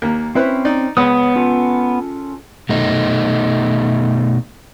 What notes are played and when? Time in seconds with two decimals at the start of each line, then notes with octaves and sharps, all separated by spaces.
0.02 D#2 A#3
0.35 C4 C#4 E4 B4 C5
0.65 D#4 D5
0.97 C#2 B3 C#5 D#6
1.36 C#4 F4 A4
2.69 B2 A3 D#4